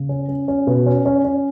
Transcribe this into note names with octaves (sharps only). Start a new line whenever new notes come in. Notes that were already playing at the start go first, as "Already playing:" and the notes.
Already playing: C#3
C#4
C#4
C#4
B2
C#4
C#4
C#4